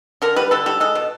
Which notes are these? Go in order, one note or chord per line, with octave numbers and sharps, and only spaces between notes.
D3 A#4
G3 B4
D3 A4
G3 A4
G#3 A4
B2